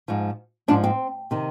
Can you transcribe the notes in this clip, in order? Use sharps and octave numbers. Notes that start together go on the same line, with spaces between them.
G#2 F3
G#2 F3 D4
C4
C3 D#3